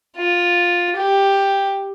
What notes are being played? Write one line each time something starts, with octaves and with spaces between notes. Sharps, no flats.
F4
G4